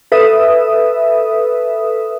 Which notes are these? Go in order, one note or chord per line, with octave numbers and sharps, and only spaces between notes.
A4 B4 E5 D#6